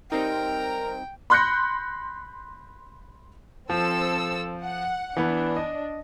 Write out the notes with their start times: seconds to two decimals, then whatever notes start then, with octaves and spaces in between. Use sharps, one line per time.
0.12 G3 C4 D#4 A#4 G5
1.30 B5 C6 F#6 G6 A#6 C#7
3.70 F3 C4 A4 E6
4.63 F#5
5.17 E3 B3 D4
5.56 D#5